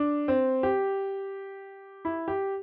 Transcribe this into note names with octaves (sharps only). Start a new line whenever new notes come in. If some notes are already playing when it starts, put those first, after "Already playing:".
Already playing: D4
C4
G4
E4
G4